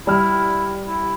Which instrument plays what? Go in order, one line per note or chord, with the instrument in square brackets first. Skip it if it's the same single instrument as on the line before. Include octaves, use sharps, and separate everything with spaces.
[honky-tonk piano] G3 F6 [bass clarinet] E4
[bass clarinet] E4